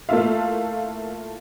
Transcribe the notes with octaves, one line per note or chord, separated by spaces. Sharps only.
A3 A#3 E4 F4 E5 F5